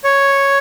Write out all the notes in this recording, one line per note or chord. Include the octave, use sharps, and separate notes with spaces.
C#5